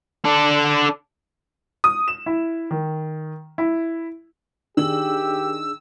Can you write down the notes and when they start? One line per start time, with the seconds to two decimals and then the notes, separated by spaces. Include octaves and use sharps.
0.25 D4 A4
1.84 D#6
2.08 E7
2.26 E4
2.71 D#3
3.58 E4
4.77 D#3 D4 G4 G#4 E6 F#7